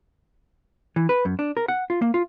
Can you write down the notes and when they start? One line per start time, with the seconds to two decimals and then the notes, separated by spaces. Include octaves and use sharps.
0.96 E3
1.09 B4
1.25 F#2
1.39 D4
1.57 A#4
1.68 F#5
1.90 F4
2.02 A#3
2.14 F4